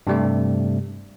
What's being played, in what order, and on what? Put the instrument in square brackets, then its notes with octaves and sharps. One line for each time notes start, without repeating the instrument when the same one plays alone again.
[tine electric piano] G2 C3 G3 A3